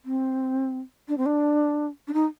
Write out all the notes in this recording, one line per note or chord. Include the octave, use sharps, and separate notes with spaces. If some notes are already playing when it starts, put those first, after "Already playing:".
C4
D4
C4
D4
D4
D#4